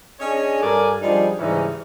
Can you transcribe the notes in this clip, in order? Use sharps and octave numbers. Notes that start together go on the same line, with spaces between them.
C#4 D4 G#4 C#5 D#5
G2 A4 A#4 D5 G#5
F3 G3 D4 D#4 G#4
G#2 C#3 E3 G3 C#4 D#4